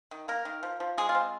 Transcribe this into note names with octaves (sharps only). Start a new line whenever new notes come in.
D#3
A#3 A#4
D#3
F3
F3
G#3 G#4
F4
C4